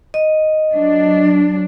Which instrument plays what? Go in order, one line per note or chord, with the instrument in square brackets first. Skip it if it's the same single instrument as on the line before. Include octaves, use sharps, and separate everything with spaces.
[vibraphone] D#5
[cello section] F#3 D4